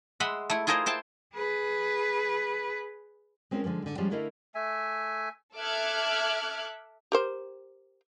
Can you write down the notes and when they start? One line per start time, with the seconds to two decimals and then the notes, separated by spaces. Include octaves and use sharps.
0.20 G#3 E5 F#5 B5 C6
0.50 A3 E4
0.67 E4 F4 G#4 A#4 C5 D#5
0.86 E4 C5 G5 A5
1.34 G#4 B4
3.51 G#3 C4 C#4 F4 A#4
3.64 D3 F3 G#3 A#3
3.82 G#2 D3
3.98 F3 G3 G#3 C#4 F4
4.11 D3 A3 E4 A#4 D#5 F5
4.55 A3 E5 G#5
5.57 A4 E5 D6 F6 F#6 G#6
7.12 G4 A#4 C5